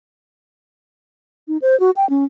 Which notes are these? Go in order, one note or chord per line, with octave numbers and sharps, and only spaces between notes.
D#4
C5
F#4
G5
C#4